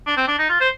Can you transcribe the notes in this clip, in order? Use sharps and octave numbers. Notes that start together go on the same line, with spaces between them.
D4
C4
D4
D#4
F4
C5